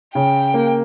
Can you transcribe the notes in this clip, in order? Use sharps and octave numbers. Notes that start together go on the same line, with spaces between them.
C#3 G5
A#3